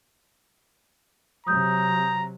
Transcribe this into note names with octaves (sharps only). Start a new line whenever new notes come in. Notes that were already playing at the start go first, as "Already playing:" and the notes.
C3 F#3 A#5 D#6 G6